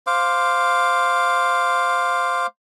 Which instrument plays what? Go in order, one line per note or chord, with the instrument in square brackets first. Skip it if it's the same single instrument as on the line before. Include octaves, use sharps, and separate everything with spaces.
[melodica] C5 F5 D6